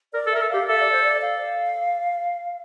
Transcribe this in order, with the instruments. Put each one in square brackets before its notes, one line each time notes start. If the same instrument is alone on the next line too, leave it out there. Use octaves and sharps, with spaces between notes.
[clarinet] A#4 [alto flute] D5
[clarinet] A4
[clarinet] A#4 [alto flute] E5
[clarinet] A4
[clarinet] G4 [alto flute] F5
[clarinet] A4 [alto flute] E5
[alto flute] D5
C5
D5
F5